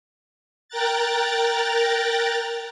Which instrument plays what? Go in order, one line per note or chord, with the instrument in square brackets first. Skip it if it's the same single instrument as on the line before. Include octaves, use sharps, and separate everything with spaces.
[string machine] A#4 G5 A#5 F#6 A6